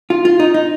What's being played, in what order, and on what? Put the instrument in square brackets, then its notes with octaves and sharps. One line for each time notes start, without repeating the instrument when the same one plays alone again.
[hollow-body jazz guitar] F4
F4
D#4
D#4